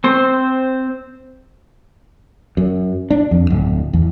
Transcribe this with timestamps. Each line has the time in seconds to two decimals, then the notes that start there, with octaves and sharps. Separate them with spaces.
0.04 C4 C5
2.57 F#2
3.10 D4
3.31 F2
3.50 D1
3.93 E2